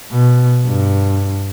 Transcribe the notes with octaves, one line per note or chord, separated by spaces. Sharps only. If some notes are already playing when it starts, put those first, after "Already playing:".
B2
G2